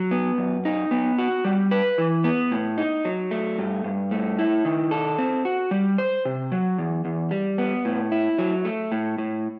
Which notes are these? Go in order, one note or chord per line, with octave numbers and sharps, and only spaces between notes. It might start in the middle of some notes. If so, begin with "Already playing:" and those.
Already playing: F#3
B3
F#2
D#4
B3
F#4
G3
B4
E3
B3
A2
D#4
F#3
A3
G2
G2
A3
E4
D#3
A4
C4
F#4
G3
C5
C3
F#3
E2
E2
G3
B3
A2
E4
F#3
A3
A2
A2